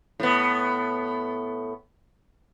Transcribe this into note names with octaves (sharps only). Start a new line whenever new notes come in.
A2 B3